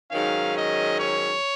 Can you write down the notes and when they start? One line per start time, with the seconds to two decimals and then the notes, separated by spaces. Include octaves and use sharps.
0.11 G#2 D#3 F#3 C#4 F5
0.56 D#5
1.00 C#5